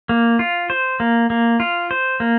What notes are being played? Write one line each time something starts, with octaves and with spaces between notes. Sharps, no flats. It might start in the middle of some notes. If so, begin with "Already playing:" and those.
A#3
F4
C5
A#3
A#3
F4
C5
A#3